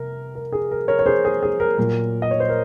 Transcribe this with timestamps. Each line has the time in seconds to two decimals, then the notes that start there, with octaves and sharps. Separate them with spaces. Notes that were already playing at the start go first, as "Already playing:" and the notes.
Already playing: C3 A#4
0.35 A#4
0.52 G#4
0.71 A#4
0.88 A#4 C#5
0.99 C#5
1.06 G#4 C5
1.25 G#4
1.43 G#4
1.60 A#4
1.78 A#2 F#3 A#3 A#4
2.22 D#5
2.31 C#5
2.40 C5
2.49 A#4